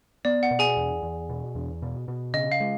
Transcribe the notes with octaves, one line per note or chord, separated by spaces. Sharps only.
B3 D5
F#5
B2
G#4 G#5
E2
E2
B2
E2
B2
B2
C#3 D#5
F5
G#3